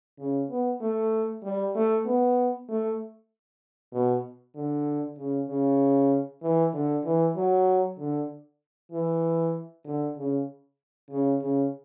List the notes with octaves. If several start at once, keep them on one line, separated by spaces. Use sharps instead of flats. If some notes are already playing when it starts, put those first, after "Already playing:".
C#3
B3
A3
G3
A3
B3
A3
B2
D3
C#3
C#3
E3
D3
E3
F#3
D3
E3
D3
C#3
C#3
C#3